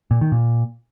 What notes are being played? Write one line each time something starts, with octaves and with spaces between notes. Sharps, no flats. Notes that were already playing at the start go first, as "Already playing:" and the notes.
A#2
D#3
A#2